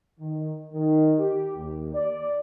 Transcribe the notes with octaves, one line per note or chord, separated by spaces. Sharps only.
D#3
D#3
G4
D#2
D5